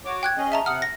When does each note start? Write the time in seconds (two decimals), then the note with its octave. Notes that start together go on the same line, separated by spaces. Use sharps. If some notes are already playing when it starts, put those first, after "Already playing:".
0.05 F#4 C#5 D6
0.23 G5 F#6 G#6
0.37 C#4 G#4 D#5
0.52 E5 A5 A#5
0.66 C3 F#5 D#6 F6
0.82 A#6